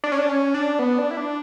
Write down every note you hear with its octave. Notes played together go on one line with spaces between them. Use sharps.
D4
C#4
D4
C#4
D4
B3
D4
E4
D4